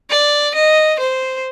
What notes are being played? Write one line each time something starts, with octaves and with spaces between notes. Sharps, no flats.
D5
D#5
C5